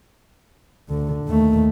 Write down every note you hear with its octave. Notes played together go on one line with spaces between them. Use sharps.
D2 D3
D#2 A3